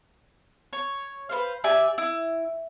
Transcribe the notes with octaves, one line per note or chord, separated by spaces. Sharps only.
C#5
B4 C5 F5
G4 D5 E5 G#5
E4